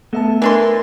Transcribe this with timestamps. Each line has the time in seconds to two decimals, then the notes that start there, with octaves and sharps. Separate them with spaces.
0.13 A3 B3 A4 E5 A5
0.42 E3 D4 A#4 C6